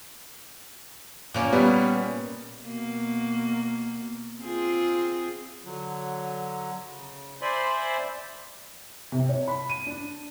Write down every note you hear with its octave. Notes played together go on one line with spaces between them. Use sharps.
A#2 A#3 C#4
G3 B3
B2 A#3
C4 F4 G#4
D3 F#3
C#3
C5 D5 E5 G#5 B5 C6
C3
C#5
B5
D#7
D4